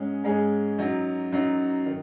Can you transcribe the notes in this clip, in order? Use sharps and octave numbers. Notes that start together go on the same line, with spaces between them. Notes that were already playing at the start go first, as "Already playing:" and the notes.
Already playing: G#2 G#3 C#4 G#4
G#2 G#3 C#4 G#4
F#2 F#3 D#4
F#2 F#3 D#4
D#3